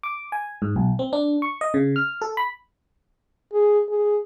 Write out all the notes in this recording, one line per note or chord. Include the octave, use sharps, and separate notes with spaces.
D6
G#5
G#2
B1
C4
D4
C#6
D#5
C#3
F6
A4
B5
G#4
G#4